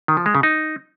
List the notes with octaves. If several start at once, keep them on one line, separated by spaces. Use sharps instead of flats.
D#3
F3
G#3
C#3
D#4